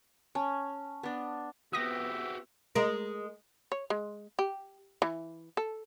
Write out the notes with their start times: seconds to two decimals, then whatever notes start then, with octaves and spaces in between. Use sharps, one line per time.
0.35 C#4 A5
1.03 B3 D4
1.73 B3 C4 F#4 G4 E5 D#6 A#6
2.75 G#3 A#4
3.72 C#5
3.90 G#3
4.39 G4
5.02 E3
5.57 A4